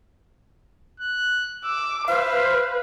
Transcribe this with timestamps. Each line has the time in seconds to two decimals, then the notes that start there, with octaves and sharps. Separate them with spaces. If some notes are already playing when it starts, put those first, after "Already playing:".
1.00 F#6
1.64 D6 E6
2.08 B4 C5 E5 F5